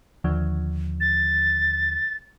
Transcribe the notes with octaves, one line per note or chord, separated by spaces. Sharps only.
D#2 D3 F3
A6